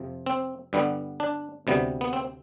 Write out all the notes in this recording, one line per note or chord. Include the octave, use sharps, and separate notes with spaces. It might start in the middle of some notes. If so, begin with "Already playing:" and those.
Already playing: F2 C3 F3
C4
G2 D3 G3 B3
D4
D2 C3 G3 B3
B3
C4